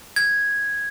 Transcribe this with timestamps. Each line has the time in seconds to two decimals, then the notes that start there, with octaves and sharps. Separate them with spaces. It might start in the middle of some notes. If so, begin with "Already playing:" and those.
0.16 G#6